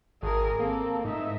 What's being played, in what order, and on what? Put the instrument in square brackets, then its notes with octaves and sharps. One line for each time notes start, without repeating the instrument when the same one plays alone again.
[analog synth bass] G#1 [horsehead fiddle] G#4 A#4
[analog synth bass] A#3 [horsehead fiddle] C4 A4
[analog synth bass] G#2 [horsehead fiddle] D#4 E5